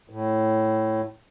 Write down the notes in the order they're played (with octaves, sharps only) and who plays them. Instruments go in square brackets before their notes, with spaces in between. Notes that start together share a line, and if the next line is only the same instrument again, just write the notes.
[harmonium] A2